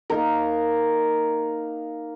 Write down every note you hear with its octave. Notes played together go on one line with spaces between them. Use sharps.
A#3 D#4 A#4